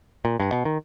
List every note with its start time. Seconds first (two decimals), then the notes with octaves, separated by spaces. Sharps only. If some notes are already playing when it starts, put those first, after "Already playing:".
0.25 A#2
0.40 G2
0.52 B2
0.65 D#3